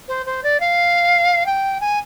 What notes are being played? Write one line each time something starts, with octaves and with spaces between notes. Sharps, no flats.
C5
C5
D5
F5
G5
G#5